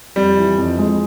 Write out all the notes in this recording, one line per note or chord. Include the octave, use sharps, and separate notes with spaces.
F2 G3
E3
F2
G#3